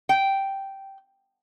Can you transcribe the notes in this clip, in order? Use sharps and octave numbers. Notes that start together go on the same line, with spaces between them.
G5